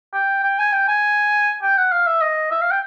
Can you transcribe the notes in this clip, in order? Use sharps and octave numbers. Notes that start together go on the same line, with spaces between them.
G5
G5
G#5
G5
G#5
G5
F#5
F5
E5
D#5
E5
F5
G5